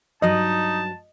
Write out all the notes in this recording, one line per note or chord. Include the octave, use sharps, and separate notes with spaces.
G2 F#3 D#4 D#5 A5